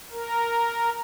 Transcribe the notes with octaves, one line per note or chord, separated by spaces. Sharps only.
A#4